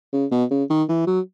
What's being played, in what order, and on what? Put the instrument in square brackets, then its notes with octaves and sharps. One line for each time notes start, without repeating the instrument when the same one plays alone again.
[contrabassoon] C#3
B2
C#3
D#3
E3
F#3